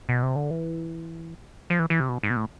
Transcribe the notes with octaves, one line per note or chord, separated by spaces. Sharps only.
B2
C3
D3
E3
F3
E3
E3
C3
B2
G#2
B2
A2